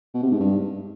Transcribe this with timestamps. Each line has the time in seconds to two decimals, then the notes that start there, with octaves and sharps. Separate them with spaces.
0.14 B2
0.23 C3
0.31 G#2
0.40 G2